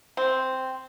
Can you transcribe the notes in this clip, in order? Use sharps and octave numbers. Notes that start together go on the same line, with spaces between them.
C4